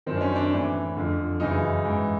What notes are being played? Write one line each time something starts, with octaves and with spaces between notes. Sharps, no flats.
F#2 D#3 C4
D4
C#4
D4
A2 E3
F2 D3
F#2 C#3 E3 D#4
G#2 E3